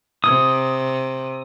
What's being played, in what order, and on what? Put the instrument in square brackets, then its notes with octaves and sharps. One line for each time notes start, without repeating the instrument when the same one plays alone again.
[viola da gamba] C3 [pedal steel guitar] D#6